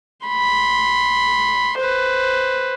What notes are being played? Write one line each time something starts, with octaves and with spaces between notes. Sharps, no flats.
B5 C6
B4 C5